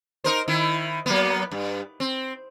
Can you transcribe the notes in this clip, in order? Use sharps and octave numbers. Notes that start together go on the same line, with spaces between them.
D#4 A#4 C5
D#3 E4
F#3 A#3 B3
G2
C4